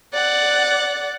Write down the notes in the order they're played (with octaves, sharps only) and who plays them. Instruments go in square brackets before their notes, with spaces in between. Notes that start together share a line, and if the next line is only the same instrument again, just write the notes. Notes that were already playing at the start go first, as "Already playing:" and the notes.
[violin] D5 F#5